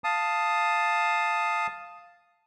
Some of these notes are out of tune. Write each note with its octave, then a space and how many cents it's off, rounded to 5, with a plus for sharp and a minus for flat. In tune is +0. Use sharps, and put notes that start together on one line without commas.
F5 +0 A5 +0 D#6 +0